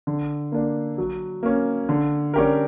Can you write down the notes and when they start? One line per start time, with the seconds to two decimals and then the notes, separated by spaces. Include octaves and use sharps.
0.07 D3
0.52 A#3 D4
0.98 F#3
1.43 A#3 C#4
1.89 D3
2.34 G3 C#4 G4 A#4